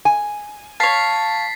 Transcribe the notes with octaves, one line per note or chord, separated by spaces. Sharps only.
G#5
C#5 F5 A5 A6 B6 C7